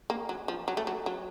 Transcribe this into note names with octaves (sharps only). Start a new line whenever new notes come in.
A#3
F#3
F3
F#3
A3
F#3
F#3